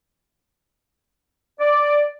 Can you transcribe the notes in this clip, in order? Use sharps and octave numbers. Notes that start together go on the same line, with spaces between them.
D5